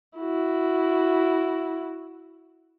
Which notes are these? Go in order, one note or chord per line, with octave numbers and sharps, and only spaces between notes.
E4 F#4